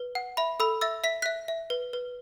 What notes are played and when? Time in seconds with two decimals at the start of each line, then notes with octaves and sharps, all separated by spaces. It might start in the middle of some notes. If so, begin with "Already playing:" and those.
Already playing: B4
0.15 F#5
0.37 E5 B5
0.60 A4 B5 E6
0.81 E5 E6 A6
1.04 E5 B6
1.22 E5 F#6 B6
1.48 E5
1.70 B4
1.93 B4